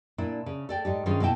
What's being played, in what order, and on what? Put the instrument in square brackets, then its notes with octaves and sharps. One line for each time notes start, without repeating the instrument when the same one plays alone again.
[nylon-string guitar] A#2 D4 E4
C#3
A4 D5 G5
G#2 D#4 G4
G2 D#3 C#4 F4 G#4 C5
B2 A#3 E4 G5 A5